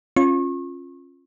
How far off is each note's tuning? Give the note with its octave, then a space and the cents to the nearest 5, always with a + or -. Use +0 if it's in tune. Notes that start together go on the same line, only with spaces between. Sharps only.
C#4 -25 F4 +0 C#6 -35